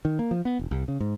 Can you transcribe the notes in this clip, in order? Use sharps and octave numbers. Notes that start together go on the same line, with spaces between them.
D#3
A#3
F3
B3
E1
C2
C#3
G#2